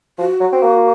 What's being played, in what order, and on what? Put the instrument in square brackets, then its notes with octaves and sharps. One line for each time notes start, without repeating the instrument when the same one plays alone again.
[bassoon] F3 [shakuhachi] F#4
[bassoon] F#3
C4
A#3